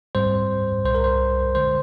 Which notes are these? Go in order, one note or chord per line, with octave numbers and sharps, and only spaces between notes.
G#2 G3 C4 C5
C2 A#2 G3 C5
A#4
C5
D3 G#3 C5